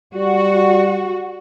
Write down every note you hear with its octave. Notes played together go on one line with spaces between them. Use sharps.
G3 F#4